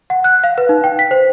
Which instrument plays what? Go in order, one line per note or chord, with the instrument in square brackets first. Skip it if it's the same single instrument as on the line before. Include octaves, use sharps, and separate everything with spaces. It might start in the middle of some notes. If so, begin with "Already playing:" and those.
[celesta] F#5
F#6
F5
B4
D#4
G5
B6
C5